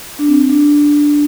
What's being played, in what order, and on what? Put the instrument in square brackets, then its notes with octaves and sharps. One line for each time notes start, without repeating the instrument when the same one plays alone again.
[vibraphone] D4
C4
D4